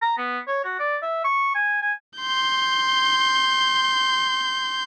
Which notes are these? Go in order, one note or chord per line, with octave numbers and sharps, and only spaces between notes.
A#5
B3
C#5
F#4
D5
E5
C#6
G#5
G#5
C6 G6